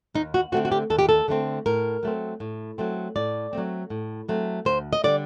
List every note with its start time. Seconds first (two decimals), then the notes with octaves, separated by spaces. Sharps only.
0.14 D#2 D#4
0.34 F#4
0.52 D3 A3 C4 F#4
0.65 F#4
0.72 G4
0.90 D#2 A4
0.99 G4
1.09 A4
1.28 D3 A3 C4
1.66 A2 A#4
2.03 F#3 A3 C4
2.40 A2
2.78 F#3 A3 C4
3.16 A2 D5
3.53 F#3 A3 C4
3.90 A2
4.29 F#3 A3 C4
4.65 D2 C5
4.93 D#5
5.04 D3 G3 D5